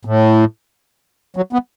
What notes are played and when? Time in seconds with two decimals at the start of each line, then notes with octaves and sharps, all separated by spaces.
0.05 A2
1.37 F#3
1.53 B3